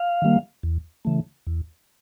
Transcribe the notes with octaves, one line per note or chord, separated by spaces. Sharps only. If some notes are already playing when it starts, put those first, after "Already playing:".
Already playing: F5
D#3 G3 A#3
E2
C#3 E3 A3
E2